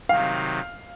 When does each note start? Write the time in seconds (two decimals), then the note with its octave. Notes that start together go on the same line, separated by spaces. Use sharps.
0.09 C3 D#3 F#3 F5